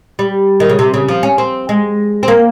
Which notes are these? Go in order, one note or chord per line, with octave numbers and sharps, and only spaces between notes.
G3
D#3
C#3
C3
C#3
F3
C#4
C4
G#3
C4
A#3